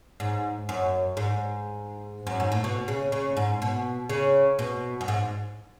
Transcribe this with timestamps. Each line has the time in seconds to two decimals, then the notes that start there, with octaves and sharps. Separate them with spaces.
0.20 G#2
0.69 F#2
1.17 G#2
2.27 F#2
2.40 G#2
2.52 A2
2.64 B2
2.88 C#3
3.12 C#3
3.37 G#2
3.62 B2
4.10 C#3
4.59 B2
5.01 F#2
5.08 G#2